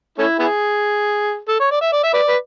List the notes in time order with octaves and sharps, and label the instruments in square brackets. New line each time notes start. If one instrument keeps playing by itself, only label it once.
[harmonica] A3 C#4 E4
B3 E4 G#4
A4
C#5
D5
E5
D5
E5
B4 D5
B4